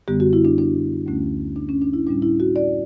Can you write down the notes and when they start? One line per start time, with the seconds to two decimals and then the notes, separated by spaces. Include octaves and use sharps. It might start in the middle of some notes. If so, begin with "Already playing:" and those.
0.08 F#2 D3 G3 B3 G4
0.20 F#4
0.33 E4
0.45 D4
0.58 D4
1.06 D2 D3 A3 C#4
1.56 D4
1.69 C#4
1.82 D4
1.93 E4
2.07 A2 G3 C#4 D4
2.22 E4
2.40 F#4
2.56 D5